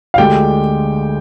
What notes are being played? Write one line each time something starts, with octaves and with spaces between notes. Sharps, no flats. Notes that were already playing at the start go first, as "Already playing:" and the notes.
F5
D2 D3 G#3 G4 G5